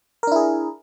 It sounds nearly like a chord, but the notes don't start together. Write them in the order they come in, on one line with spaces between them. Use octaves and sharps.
A#4 D4 E4 G#4